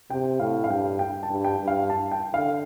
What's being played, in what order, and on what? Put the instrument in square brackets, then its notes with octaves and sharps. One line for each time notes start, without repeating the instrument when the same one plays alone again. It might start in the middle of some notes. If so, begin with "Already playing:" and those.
[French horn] C3 [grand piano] G5
[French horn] A2 [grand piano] F5
[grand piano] F5
[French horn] G2 [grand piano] G5
[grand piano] G5
A5
[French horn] G2
[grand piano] G5
[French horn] G2
[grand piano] F5
A5
G5
[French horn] D3 [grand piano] F5